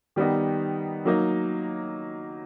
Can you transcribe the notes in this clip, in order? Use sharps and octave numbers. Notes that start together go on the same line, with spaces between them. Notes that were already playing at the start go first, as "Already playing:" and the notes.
D#3 G3 B3 D#4
F#3 A#3 D#4